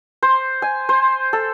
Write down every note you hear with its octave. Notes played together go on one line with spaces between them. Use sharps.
C5
G#5
C5
A4